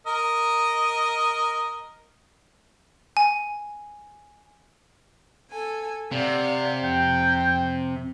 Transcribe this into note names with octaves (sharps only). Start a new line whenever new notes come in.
A#4 D#5
G#5
A4 G#5
C3 D5 F5 F#5
F2 G5